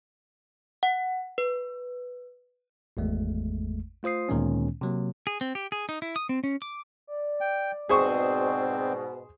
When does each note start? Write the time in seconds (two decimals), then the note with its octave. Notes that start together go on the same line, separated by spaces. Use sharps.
0.83 F#5
1.38 B4
2.97 G#1 E2 G#3 A3
4.03 A3 F4 C5 D#6 C7
4.29 D2 A#2 D#3 G#3 B3 C#4
4.81 C3 F#3 A#3
5.27 G#4
5.41 C4
5.55 G4
5.72 G#4
5.89 D#4
6.02 E4
6.16 D#6
6.29 C4
6.44 C#4
6.62 D6
7.07 D5
7.41 G5
7.89 G#2 B2 C4 G#4 C5 C#6